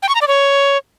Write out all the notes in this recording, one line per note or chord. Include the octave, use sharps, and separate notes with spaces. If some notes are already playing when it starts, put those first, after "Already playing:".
G5
C#6
A#5
D5
C#5